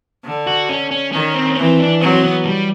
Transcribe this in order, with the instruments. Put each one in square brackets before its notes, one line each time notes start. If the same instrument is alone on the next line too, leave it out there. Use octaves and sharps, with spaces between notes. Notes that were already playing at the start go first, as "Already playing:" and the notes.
[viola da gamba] D3
[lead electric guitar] F#4
C#4
C#4
[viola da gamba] D#3 [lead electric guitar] C#4
[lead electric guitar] C4
C#4
[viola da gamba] E3 [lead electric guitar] C4
[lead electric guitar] D4
[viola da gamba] F#3 [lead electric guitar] C4
[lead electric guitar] B3
G3